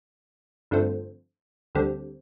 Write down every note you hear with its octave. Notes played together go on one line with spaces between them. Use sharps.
G2 D3 F3 A3 C4
D2 D3 G3 C4